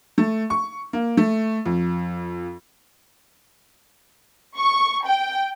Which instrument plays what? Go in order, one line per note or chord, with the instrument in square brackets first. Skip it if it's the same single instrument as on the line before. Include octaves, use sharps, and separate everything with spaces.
[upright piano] A3
C#6
A#3
A3
F2
[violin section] C#6
G5